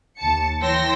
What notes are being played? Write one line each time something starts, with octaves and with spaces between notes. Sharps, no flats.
D#2 A5 C#7
E3 C#5 G5 C6 E6 A#6